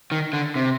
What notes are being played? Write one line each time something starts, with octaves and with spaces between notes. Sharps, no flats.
D#3
D3
C3